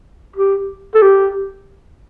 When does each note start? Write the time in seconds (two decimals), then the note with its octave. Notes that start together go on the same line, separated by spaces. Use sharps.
0.36 G4
0.95 A4
1.02 G4